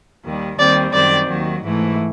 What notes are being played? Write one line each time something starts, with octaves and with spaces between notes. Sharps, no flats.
D#2 D#3 G3
D#2 D#3 G3 C4 D5
F#2 D#3 G3 C4 D5
D#2 D#3 F#3
G#2 E3 A3